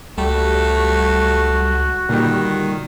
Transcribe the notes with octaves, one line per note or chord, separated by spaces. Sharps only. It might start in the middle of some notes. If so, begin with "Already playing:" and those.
C#2 G3 A3 F#4
A#2 D3 D#3 G3